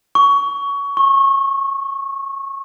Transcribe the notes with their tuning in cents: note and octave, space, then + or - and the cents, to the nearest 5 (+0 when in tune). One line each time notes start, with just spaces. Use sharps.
C#6 +20
C#6 -25